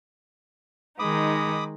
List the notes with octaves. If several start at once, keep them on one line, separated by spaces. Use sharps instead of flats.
D#3 G#3 D#4 B5 D6 D#6